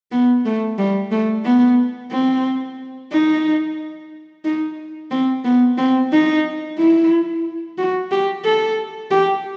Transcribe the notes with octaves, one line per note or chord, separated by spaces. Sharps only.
B3
A3
G3
A3
B3
C4
D#4
D#4
C4
B3
C4
D#4
E4
F#4
G4
A4
G4